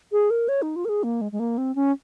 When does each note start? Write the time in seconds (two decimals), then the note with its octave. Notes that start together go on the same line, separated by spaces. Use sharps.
0.12 G#4
0.30 A#4
0.48 C#5
0.62 D#4
0.76 F4
0.85 A#4
0.89 G#4
1.03 A#3
1.21 G#3
1.32 G#3
1.39 A#3
1.58 C4
1.75 C#4